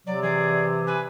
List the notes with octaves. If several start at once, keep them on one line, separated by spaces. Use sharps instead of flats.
C3 F#3 D5
E3 G#4 D5
B4 G#5